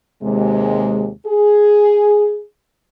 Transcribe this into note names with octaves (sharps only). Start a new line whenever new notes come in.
D#2 C3 G#3
G#4